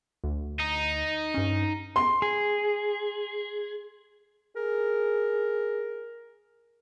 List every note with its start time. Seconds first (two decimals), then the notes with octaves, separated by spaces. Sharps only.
0.24 D2
0.60 D#4
1.34 G2 C#4
1.96 C6
2.22 G#4
4.56 G#4 A#4